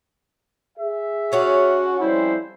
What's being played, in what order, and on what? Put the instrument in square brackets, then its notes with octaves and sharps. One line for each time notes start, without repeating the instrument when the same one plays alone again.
[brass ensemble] G#4 E5
[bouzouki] C#3 C#4 D4 [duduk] F#4
[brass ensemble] F2 G3 C5 [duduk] E4